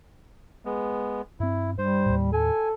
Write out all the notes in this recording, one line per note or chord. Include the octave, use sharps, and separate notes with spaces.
G#3 B3
G2 C4 E4
G2 G3 C5
D#2 A2
A4 G#5